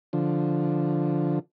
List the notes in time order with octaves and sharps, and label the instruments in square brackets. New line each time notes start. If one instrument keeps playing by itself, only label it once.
[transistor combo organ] D3 F3